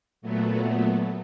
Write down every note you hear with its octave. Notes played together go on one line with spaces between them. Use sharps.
A#2 F#3 A3 B3